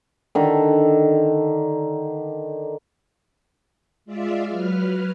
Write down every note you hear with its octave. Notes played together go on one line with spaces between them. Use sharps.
D3 D#3
G#3 F4 D5 E5 F5
F#3 B4 F6